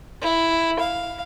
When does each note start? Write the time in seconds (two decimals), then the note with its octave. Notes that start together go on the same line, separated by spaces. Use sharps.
0.21 E4
0.79 F5